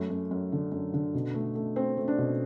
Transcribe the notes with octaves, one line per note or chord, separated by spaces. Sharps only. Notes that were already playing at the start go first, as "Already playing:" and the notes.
Already playing: F#2 A3
F#2
F#2
D3
F#2
D3
B2
A3
A3
A3 C4
A3
D4
B2